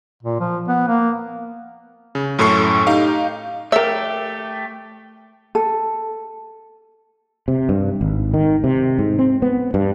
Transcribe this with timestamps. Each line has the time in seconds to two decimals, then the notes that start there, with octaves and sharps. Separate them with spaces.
0.23 A#2
0.41 F3
0.68 B3
0.88 A#3
2.15 C#3
2.39 F#2 A2 C#4 A4 C#6 C7
2.87 D#4 G4 F5
3.72 A3 G4 A#4 E5
5.55 A4
7.48 C3
7.69 G2
8.01 G#1
8.34 D#3
8.64 C3
8.99 G#2
9.19 C4
9.42 B3
9.74 G2